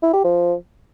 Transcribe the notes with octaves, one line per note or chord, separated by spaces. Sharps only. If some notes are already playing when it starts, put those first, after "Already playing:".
E4
G4
F3